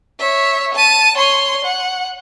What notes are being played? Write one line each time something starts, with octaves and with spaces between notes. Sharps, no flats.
C#5 E5
A5 D#7
C#5 C6
F#5